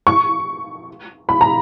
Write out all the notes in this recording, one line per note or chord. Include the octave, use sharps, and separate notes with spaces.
C#6
B5
A#5